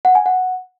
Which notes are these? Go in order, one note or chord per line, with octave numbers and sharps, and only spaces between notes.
F#5
G#5
F#5